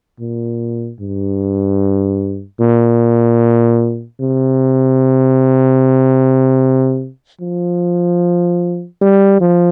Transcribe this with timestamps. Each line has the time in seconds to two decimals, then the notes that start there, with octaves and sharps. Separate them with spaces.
0.20 A#2
1.00 G2
2.61 A#2
4.21 C3
7.41 F3
9.02 G3
9.41 F3